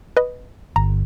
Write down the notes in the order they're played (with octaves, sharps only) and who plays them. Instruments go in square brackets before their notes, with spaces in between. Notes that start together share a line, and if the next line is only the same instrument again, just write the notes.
[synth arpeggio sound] B4 D#5
[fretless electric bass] G1 [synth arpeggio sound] A#5